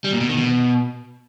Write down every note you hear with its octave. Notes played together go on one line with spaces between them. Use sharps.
G3
A#2
B2
D#3
B2